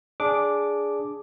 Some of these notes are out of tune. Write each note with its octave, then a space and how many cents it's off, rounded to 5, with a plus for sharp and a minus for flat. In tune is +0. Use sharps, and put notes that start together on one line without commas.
D4 -10 G#4 +0 D6 +0